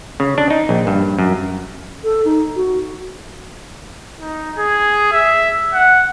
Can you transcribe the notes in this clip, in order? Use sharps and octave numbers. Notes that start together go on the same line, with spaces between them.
C#3
D4
D#4
A#1
G2
F#2
A4
D#4
F#4
D#4
G#4
E5
F#5